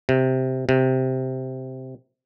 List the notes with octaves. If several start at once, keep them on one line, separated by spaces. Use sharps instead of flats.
C3
C3